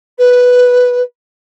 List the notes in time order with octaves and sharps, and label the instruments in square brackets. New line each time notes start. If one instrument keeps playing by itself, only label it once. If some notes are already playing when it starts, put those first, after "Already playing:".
[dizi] B4